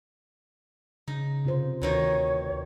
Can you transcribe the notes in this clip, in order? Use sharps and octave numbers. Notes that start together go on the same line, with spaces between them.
C#3 D#4
C3 F4 C5
D2 B2 D#3 D#4 C#5